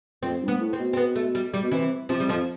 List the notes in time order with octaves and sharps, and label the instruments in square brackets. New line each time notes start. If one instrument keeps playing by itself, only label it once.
[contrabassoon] F2 [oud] C4
[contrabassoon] G2
[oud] B3
[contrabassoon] A2
[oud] C4
[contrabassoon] B2
[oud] C4
B3
A3
G3
G3
[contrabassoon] B2
[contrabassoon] C3 [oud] E3
[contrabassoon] C3 [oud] F3
[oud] G3
[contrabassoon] F2 [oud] F3